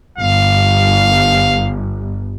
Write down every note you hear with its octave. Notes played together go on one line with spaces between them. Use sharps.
G1 F5